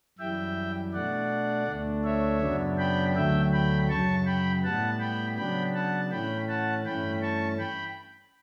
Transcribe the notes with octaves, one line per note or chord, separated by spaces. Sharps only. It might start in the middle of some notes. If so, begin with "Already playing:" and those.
F#2 E3 G3 E5 G5
B2 A3 D4 D5 F#5
D2 D3 A3 D4
C#5 E5
F#2 C#3 F#3 B3 D4
G5 B5
D2 D3 F#3 A3 E5 G5
G5 B5
F#2 C#3 F#3 A5 C#6
G5 B5
A2 G3 B3 F#5 A5
G5 B5
C#3 F#3 B3 D4 G5 B5
F#5 A5
A2 E3 A3 C#4 G5 B5
F#5 A5
G2 E3 A3 C#4 G5 B5
A5 C#6
G5 B5